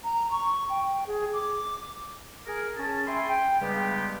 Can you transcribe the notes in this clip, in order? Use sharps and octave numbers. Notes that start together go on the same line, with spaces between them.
A#5
C#6
G5
G#4
D6
G#4 A#4
C#4 G#4 A5
E5 G5 G#5 B5 C6
G5
G2 C#3 G3 G#3 B3 G4